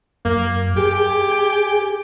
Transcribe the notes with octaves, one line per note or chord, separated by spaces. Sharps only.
F#2 A#3
G4 G#4